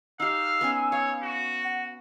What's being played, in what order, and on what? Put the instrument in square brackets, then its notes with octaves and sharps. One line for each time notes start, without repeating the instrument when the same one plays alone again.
[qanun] D#4 G4 [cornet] F5 [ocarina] E6
[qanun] B3 C#4 G#5
[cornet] C#5 [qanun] F5
[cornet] F#4
[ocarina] F#5